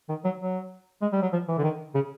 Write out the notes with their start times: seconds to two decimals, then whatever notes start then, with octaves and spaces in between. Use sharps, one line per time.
0.09 D#3
0.25 F#3
0.40 F#3
1.02 G#3
1.13 G3
1.23 F#3
1.33 F3
1.49 E3
1.58 D3
1.64 D#3
1.95 C#3